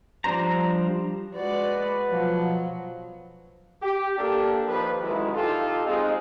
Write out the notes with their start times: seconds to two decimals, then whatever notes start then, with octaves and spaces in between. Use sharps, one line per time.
0.24 F3 G3 D4 C5 A#5
1.36 G#3 F#4 B4 D5
2.11 B2 F3 F#3
3.82 G4
4.18 A#3 D4 G4 A4
4.67 D#2 F3 B4
5.01 A1 D#3 F#3 G#3 E4
5.34 D#4 F4 G4 A4
5.85 G#3 C4 D#4 F4 G#4